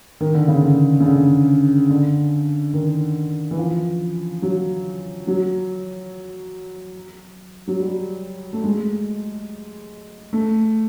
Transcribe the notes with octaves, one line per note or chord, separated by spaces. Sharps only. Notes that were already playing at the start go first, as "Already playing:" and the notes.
D#3
D3
C#3
D3
C#3
D3
D3
D#3
E3
F3
F#3
F#3
F#3
G3
A3
G#3
A3